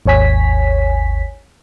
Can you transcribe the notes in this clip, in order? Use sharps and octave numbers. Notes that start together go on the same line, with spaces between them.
G#1 D#2 C#5 G#5 B6